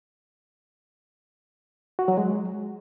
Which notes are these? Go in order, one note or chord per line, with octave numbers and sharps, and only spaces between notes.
F#4
F#3
G#3